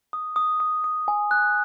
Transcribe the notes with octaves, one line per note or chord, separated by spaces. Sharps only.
D#6
D#6
D#6
D#6
G#5
F#6